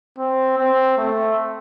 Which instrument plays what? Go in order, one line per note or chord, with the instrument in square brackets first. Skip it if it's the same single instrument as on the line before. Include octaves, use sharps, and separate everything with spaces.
[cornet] C4
C4
A3